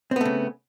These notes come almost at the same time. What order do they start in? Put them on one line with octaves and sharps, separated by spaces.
C4 B3 A3 C#3